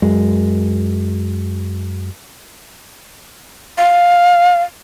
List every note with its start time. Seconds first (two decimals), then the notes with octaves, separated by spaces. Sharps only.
0.02 F#2 G#3
3.78 F5